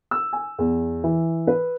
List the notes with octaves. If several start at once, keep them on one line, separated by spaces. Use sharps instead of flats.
E6
G#5
E2
E3
B4